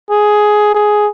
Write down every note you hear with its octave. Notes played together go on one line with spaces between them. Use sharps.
G#4
G#4